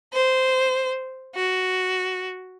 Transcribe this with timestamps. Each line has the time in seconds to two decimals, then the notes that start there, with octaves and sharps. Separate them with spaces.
0.13 C5
1.36 F#4